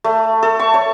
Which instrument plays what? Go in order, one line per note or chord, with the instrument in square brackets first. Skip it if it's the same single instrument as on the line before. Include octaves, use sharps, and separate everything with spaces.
[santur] A3
A4
C#6
C#5